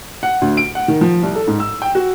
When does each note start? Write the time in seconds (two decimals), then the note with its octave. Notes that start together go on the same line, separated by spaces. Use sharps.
0.23 F#5
0.41 D2
0.57 D7
0.75 F#5
0.88 D#3
1.01 F3
1.23 C2
1.35 A4
1.47 G#2
1.60 E6
1.82 G5
1.95 F#4